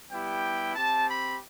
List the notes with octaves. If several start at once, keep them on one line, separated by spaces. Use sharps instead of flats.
G3 B3 E4 G4 G5
C4 G4 A5
B5